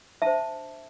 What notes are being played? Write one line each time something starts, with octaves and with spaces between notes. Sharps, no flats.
D4 C5 E5 A5